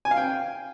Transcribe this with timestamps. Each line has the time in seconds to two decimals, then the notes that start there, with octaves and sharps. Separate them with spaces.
0.05 G#5
0.11 F5
0.17 G5